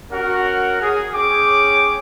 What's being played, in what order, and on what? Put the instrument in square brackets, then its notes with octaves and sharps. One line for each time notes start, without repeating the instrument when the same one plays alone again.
[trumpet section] C#4 F#4 A#4 F#5
G#4
C#4 G#4 C#5 G5 D6